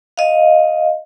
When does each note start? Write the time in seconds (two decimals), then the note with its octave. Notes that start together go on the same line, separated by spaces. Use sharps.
0.17 D#5 F5